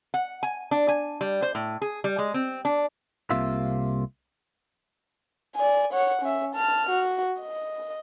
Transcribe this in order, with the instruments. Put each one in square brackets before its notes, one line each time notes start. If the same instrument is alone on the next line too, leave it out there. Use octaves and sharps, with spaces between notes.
[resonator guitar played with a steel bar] F#5
G#5
D4
G#5
G3
C5
A2
G#4
G3
G#3
C4
D4
[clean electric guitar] C2 C3 A#3 F4 E5
[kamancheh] D5 G#5
C#5 F#5
C#4 E5
A5 F6
F#4
D#5